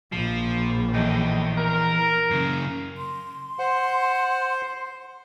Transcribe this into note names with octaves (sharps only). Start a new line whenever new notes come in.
A#1 F3
E2 A2 D#5 G5
A#4
F#2 C#3
C6
C5 F#5